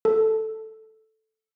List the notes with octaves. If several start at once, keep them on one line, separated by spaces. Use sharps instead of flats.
A4